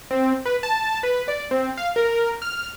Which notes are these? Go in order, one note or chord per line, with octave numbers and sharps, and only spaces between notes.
C4
B4
A5
B4
D5
C4
F5
A#4
F6